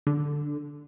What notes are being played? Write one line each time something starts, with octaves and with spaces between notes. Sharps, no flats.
D3